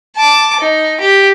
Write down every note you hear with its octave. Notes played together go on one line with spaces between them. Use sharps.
A5 D6
D#4
G4